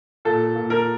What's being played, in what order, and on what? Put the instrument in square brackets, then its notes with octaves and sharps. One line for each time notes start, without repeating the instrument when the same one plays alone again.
[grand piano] A#2 A4
A#2
A#4